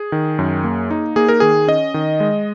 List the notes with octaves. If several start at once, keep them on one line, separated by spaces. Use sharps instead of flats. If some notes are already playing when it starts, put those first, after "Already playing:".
Already playing: G#4
D#3
F#2
A#3
D#4
A#3 G#4
A#4
D#3 G#4
C#4 D#5
D#3
G#3